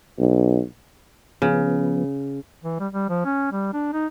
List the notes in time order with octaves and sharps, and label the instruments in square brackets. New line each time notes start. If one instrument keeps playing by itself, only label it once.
[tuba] B1
[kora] C#3 [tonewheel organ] F3 B3
[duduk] E3
G3
G3
F3
C#4
G3
D4
D#4